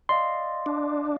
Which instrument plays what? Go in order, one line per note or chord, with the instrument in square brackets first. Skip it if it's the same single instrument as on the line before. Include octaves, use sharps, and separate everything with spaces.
[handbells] D5 D#5 F5 [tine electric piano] C6
[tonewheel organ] D4